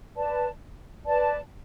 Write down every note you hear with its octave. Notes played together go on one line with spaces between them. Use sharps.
B4 D5 A5
B4 D5 A5